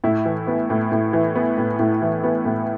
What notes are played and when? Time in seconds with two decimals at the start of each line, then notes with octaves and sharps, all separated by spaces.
0.04 A2 E4
0.25 E3
0.47 B3
0.70 A2
0.92 A2
1.13 E3
1.35 B3
1.58 A2
1.79 A2
2.02 E3
2.24 B3
2.45 A2